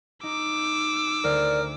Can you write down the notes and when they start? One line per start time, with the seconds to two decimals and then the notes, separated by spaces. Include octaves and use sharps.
0.23 D#4 D6 E6
1.24 D2 A#4 C5 D5